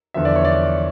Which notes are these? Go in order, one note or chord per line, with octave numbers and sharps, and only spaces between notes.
E2 D3 F3 E5
D5
C#5
D5